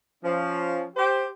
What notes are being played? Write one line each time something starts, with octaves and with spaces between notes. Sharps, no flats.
F3 C#4
G4 C5